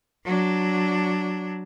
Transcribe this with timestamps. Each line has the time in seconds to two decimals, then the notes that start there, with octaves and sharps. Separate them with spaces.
0.25 F#3 D4